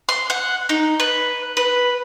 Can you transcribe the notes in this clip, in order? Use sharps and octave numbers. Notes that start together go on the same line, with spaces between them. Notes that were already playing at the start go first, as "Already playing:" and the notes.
C6
F#5
D#4
B4
B4